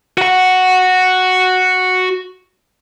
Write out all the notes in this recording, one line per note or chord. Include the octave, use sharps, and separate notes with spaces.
F#4 F#5